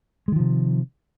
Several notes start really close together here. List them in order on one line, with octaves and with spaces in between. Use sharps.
G#3 D#3 F3 C3